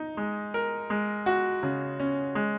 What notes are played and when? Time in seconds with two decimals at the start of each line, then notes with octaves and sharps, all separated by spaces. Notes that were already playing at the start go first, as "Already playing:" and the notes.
Already playing: D#4
0.17 G#3
0.54 A#4
0.90 G#3
1.26 F#4
1.63 C#3
2.00 C#4
2.35 G#3